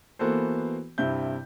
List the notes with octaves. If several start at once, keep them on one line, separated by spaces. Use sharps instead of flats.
E3 A#3 B3 F#4 A4 C5
G2 C3 E4 G6